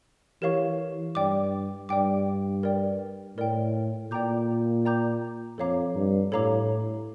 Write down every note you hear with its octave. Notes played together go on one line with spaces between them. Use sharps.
E3 G4 A#4 C#5 F5 C#6
G2 D5 G5 D6
G2 D5 G5 D6
A#4 D5 G5
A2 A#4 D5 G5
A#2 D5 G5 A#5 D6 G6
D5 G5 A#5 D6 G6
F2 A4 C#5 F5 A#5 D6
G2
A2 A4 C#5 F5 A#5 D6